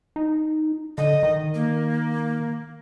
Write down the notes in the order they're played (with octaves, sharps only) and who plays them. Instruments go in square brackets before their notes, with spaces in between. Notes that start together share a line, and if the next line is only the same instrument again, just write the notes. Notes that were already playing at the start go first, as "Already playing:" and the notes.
[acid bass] D#4
[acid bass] D3 [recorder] D#5
[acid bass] D#3
[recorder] A#3